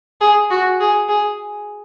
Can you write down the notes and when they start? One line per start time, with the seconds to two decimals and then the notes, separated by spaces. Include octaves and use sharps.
0.21 G#4
0.51 F#4
0.80 G#4
1.09 G#4